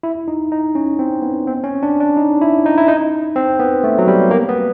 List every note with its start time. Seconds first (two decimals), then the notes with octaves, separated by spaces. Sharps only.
0.03 E4
0.28 D#4
0.52 D#4
0.75 C#4
0.99 C4
1.22 B3
1.47 C4
1.64 C#4
1.83 D4
2.00 D4
2.17 D#4
2.42 E4
2.66 D#4
2.78 E4
2.88 D#4
3.36 C4
3.60 B3
3.84 A3
3.98 F#3
4.08 G3
4.31 A#3
4.49 B3